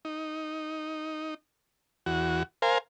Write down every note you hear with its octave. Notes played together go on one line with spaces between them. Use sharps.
D#4
E2 F#4
A#4 C5 F5 G#5